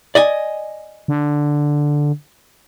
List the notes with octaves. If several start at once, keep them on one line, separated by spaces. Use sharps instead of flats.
D5 D#5 G#5
D3